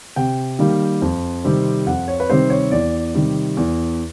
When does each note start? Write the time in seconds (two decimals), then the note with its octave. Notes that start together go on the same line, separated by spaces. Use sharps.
0.16 C3 G5
0.59 D#3 G3 A#3
1.02 F2
1.44 C3 D#3 G3 C4
1.86 F2 F#5
2.08 C#5
2.20 B4
2.30 C3 D#3 G3 C4 C5
2.50 C#5
2.71 E2 D5
3.14 C3 D#3 G3
3.57 E2